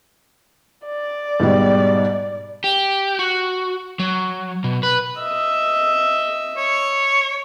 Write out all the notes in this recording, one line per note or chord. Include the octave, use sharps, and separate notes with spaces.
D5
G#2 B2 G3
G4
F#4
F#3
B2
B4
D#5 E5
C#5